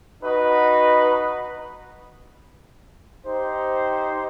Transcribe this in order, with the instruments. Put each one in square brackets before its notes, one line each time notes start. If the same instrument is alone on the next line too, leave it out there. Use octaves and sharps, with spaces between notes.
[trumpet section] D#4 F#4 B4 D#5
D#4 G4 C5